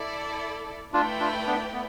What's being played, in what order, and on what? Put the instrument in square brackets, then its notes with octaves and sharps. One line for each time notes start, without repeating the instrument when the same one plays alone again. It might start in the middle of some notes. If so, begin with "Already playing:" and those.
Already playing: [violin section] E4 A4 D5
[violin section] A3 E4 B4 D5 G5 [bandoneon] D4 F4
[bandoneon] D4 F4
B3 D4
B3